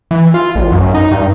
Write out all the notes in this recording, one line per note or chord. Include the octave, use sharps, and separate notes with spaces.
E3
F4
A1
F#2
D#4
G2